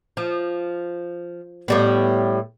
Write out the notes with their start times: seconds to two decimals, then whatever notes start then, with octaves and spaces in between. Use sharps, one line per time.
0.17 F3
1.68 A2 G3 B3